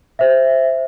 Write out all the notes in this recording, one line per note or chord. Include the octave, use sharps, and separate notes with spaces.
C5 E5